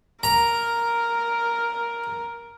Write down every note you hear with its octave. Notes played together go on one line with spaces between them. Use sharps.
A#4 A#5